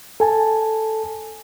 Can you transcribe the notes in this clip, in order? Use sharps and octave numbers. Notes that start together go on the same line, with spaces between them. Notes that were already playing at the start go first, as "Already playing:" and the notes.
A4 G#5 A5